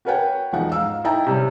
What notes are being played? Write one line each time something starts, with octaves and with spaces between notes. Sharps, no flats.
F#4 A#4 B4 C#5 F#5 G5
E1 F3 D#4 F#5
G#2 F5 E6
D#4 E4 E5 G5 A5 A#5
C3 G3 C#4